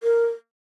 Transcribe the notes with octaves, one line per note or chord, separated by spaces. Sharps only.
A#4